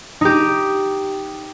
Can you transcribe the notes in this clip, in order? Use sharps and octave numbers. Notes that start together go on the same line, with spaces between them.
D#4 G4